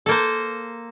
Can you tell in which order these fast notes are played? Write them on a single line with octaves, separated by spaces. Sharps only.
A4 A#3 C5